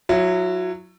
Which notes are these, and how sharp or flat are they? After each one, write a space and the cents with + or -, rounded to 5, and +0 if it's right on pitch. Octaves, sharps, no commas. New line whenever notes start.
F#3 -15 E4 +20